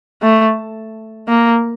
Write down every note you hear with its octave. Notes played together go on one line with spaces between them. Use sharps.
A3
A#3